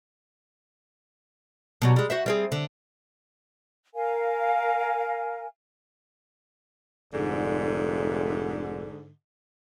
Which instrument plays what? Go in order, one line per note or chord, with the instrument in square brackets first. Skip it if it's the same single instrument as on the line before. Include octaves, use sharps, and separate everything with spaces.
[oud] B2 F#3 G3
G3 G#3
F#4 C5 E5
G3 C4 G#4
D3
[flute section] A#4 F5 G#5
[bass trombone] F1 [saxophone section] G#2 D3